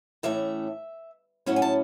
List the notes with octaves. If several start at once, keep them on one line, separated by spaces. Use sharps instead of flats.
A2 E3 A3 C#4 E5
A2 F#3 C#4 E4 F#5
G#5
A5